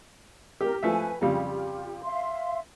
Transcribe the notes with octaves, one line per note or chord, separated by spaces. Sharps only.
G4 A#4
F3 A3 B4 E5 G#5
F2 C#3 G3 F4 G4
E5 F5 C6